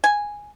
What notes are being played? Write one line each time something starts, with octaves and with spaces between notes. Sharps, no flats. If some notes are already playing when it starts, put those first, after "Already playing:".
G#5